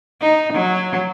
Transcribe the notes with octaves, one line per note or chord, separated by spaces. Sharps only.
D#4
F#3